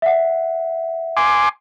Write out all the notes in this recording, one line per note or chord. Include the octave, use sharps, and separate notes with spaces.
E5 F#5
G#5 C6 D6